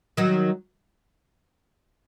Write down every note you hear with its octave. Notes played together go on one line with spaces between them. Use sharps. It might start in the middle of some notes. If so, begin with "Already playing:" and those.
D#3 F#3